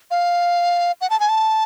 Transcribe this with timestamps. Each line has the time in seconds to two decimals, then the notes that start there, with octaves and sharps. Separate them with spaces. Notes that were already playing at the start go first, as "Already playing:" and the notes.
0.11 F5
1.01 F#5
1.10 A5
1.20 G#5
1.29 A5